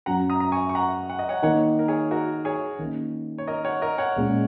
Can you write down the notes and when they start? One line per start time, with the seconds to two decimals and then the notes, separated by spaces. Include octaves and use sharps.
0.06 F#2 F#3 C#4 F#5 A#5
0.30 A#5 D#6
0.40 A#5
0.52 G#5 C#6
0.69 C#6
0.75 F#5 A#5
1.10 F#5
1.19 D#5
1.29 C#5 F#5
1.42 D#3 A#3 D#4 C#5 F#5
1.79 A#4
1.88 G#4 C#5
2.11 F#4 A#4
2.45 G#4 C#5
2.79 D#3 A#3 C#4
3.38 C#5
3.47 A#4 D#5
3.65 C#5 F#5
3.82 A#4 D#5
3.98 C#5 F#5
4.16 A#2 G#3 C#4